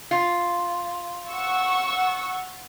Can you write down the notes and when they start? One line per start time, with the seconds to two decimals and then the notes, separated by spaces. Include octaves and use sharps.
0.11 F4
1.29 F#5 C#6 E6